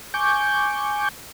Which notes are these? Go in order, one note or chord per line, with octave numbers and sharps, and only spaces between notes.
G#5 C#6 D6 G6